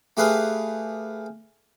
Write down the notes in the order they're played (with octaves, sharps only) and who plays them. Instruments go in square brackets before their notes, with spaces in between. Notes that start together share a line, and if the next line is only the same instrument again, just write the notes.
[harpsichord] A3 G4 G#4 B4 F5